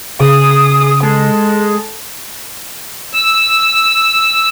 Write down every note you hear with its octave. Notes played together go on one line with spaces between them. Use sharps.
C#3 G#4 D#6
G#3 A4
E6